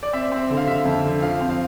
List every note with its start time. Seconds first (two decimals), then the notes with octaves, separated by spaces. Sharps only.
0.03 D5
0.13 C4 E5
0.32 C4
0.50 D3
0.57 F5
0.67 D3 E5
0.85 F2
1.05 D3
1.22 F3 F5
1.41 C4
1.50 F5